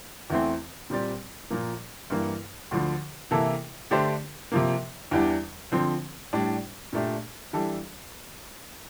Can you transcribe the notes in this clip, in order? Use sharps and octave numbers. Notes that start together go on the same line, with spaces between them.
E2 E3 A3 C4
A#2 G3 C4 G4 D5
A#2 F3 A#3
G2 E3 A#3
D2 D3 F3
C3 E3 A#3 E4 A4
D3 A3 D4 G4 C5
C3 F3 A#3
E2 E3 G3 D4
D3 F3 C4
A2 G3 D4
A#2 A3 D4 G4
E3 G3 D4 A4